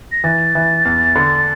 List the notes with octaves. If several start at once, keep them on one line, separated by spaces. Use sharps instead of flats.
A#6
E3 A6
E3
E2
D3